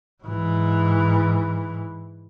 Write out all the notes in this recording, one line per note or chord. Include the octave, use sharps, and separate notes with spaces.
G#2 E3